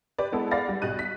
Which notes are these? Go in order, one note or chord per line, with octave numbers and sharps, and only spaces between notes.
G4 B4 D5
G#3 B3 E4 G#4 A4
D5 F5 F#5 B5 A6 A#6
G3
B1 G4 D#5 F#6 D#7
B6